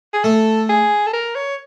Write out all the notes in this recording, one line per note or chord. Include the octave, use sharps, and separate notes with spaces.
G#4
A3 A4
G#4
A4
A#4
C#5